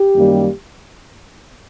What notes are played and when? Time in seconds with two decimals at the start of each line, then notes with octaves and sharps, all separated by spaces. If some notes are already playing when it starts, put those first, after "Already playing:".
Already playing: G4
0.15 F#2 D#3 G3 A#3